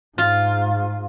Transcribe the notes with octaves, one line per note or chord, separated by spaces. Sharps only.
G#2 F4